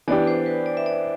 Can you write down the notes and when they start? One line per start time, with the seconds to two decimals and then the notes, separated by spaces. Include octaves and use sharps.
0.08 E3 B3 D4 G4 D5
0.27 C5
0.46 B4
0.66 D5
0.77 E5
0.86 D5